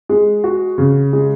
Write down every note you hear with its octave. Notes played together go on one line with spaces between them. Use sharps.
G#3
F#4
C#3
G#3